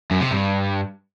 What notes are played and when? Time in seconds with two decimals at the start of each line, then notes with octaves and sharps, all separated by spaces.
0.11 F#2
0.21 C3
0.31 G2